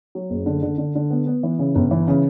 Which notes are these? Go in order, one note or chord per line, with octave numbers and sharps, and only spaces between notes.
F#3
F#1
D3
D3
D3
D3
B3
B3
E3
C#3
G1
E3
C#3